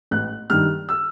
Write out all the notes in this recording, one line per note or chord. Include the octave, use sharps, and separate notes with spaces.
A1 F#6
G2 D#3 F6
E6